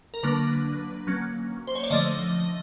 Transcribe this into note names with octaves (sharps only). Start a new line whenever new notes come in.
A#4
D3 F#3 A#3 D4 B4
F#3 A#3 C#4
C5
C#5
D5
D3 F3 A3 D#5